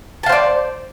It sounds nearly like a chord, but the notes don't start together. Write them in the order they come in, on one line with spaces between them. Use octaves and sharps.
A5 F5 C5 D5